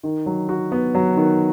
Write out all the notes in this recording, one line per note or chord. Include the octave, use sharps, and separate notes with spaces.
D#3
F#3
F#4
B3
F#3
D#3